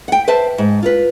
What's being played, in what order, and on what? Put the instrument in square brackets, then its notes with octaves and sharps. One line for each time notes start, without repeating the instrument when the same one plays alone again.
[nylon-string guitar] F#5 G5
B4 C5 E5 A5
G#2
F4 A#4 B4